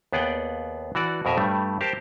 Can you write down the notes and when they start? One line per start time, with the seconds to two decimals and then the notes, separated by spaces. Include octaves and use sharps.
0.13 D#2 B3 G#4 D5 F#5 G5
0.95 E3 F#4 D5
1.25 F2 B2 A#4 E5 G#5
1.37 G2 G3 A3
1.81 G4 A#4 C5 A5